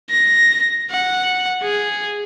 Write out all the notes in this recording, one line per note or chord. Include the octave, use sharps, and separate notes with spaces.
A#6
F#5
G#4